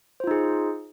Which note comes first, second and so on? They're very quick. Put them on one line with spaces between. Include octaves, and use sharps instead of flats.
C5 F4 D#4 G#4